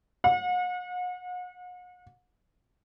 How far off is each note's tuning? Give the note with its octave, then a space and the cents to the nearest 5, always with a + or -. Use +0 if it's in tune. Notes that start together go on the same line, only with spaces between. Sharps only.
F#5 -40